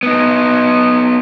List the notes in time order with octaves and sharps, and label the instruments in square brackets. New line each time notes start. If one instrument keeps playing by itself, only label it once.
[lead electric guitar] B3 D#4